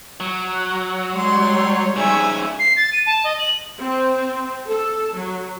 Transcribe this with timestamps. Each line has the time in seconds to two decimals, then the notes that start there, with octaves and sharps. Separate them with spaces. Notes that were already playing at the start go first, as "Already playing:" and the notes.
0.20 F#3
1.15 G3 G#3 C#5 C6
1.96 G#2 C#3 E5 G#5 G#6
2.59 C7
2.76 A6
2.92 D#7
3.06 A5
3.24 D#5
3.39 F#7
3.79 C4
4.67 A4
5.15 F#3